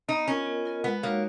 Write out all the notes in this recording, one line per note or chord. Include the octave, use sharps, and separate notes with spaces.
B3 D#4
C#4 F4 A#4 D#5
B3
F4 A#4 D#5
G#3 B3
A#3 D#4 F#4 C#5